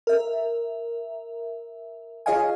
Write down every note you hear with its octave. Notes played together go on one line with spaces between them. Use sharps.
A#4 E5
F4 G#4 C#5 D#5 F5 G#5